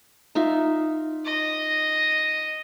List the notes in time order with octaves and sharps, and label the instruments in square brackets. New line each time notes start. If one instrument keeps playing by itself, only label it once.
[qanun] D#4 F4 E5
[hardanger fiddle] D#5